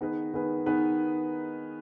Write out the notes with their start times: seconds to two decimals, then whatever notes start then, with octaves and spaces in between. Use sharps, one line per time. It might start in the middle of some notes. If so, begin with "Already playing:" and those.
0.01 D#3 B3 D#4 G#4 B4
0.34 D#3 B3 D#4 G#4 B4
0.66 D#3 B3 D#4 G#4 B4